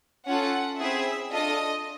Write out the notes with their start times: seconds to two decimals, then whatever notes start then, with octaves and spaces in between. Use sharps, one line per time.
0.26 C#4 F4 A4 F#5
0.78 C4 E4 G#4 E5
1.31 D4 F4 A4 D#5